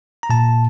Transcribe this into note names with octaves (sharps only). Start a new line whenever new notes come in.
A#5
A#2 A5